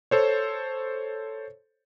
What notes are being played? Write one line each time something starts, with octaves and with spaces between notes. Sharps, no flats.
A4 C5 C#5